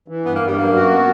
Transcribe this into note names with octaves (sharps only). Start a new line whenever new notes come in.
E3
G2 B3
A#3
G2
G3
F#2 A#3
F#4
B3